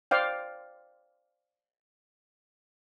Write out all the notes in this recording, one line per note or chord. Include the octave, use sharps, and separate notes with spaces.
C5 D5 F5 G5